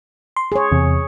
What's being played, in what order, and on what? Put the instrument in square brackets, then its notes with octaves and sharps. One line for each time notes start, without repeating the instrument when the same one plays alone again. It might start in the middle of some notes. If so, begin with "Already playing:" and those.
[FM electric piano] C6
[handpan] G#4 C#5
[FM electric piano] E2 C3